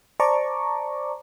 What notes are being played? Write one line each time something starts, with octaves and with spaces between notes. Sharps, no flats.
C5 D5 A5 A#5 C#6 D6